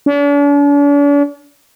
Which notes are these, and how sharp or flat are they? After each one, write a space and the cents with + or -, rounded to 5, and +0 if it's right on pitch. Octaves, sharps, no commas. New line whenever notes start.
D4 -45